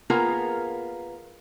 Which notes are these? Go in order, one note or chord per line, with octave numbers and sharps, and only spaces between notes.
A#3 B3 F4 G#4 A#4